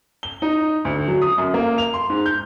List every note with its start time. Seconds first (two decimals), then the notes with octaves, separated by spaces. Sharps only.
0.23 G7
0.42 D#4
0.85 D2
1.08 F#3
1.22 D#6
1.38 F#2
1.54 A#3
1.78 F7
1.94 C6
2.10 G#2
2.26 G6